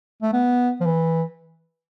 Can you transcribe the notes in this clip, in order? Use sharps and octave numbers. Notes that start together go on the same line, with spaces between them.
A3
B3
F3
E3